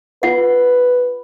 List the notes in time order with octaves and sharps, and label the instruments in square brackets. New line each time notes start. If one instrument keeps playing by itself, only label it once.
[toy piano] F4 F#5 [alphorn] B4